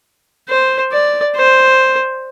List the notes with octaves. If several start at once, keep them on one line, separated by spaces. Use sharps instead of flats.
C5
D5
C5